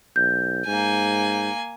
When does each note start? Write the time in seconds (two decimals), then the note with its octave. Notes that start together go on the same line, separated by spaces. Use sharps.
0.16 B1 G6
0.67 G#2 A#3 G#5